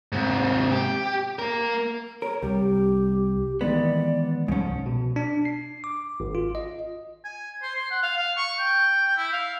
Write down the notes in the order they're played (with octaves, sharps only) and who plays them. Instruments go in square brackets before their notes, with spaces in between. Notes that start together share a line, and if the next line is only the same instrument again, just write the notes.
[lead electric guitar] G#2 C3
G4
A#3 A#4
[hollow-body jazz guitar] A#4 [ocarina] C#5
[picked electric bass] C2 [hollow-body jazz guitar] G3 [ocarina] G4
[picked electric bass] D#3 E3 G#3 [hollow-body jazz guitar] B3 [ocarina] D5
[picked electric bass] C2 F3 [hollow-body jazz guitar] G#2 C#4
[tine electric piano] B2
D4
C7
D6
G#1
F4
D#5
[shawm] G#5
C5
C6
F#5
F5
F5
C#6
G5
E4
F5